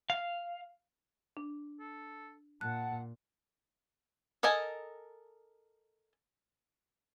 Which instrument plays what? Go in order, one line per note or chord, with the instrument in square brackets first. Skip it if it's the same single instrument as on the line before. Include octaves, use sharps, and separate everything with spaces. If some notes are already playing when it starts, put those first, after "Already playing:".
[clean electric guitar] F5
[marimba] D4
[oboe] A4
[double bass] A#2 [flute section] F#5 [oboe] A5 [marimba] F#6
[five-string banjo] A4 A#4 D#5 G#5 A5